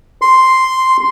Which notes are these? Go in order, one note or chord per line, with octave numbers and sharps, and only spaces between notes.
C6